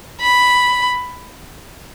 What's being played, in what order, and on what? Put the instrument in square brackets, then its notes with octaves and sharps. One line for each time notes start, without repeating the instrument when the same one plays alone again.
[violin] B5